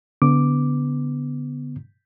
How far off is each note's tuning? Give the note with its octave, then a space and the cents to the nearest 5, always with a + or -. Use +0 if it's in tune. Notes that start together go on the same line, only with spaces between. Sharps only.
D3 -30 B3 +0 D6 +0